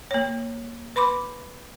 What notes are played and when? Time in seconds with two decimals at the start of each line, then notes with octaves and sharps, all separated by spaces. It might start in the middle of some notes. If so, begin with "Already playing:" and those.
0.11 A#3 C#5
0.96 B4 B5 C6 D6